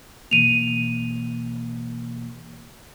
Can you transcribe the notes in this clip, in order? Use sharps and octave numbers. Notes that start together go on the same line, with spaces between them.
B2 E3 A#3 D#7 F7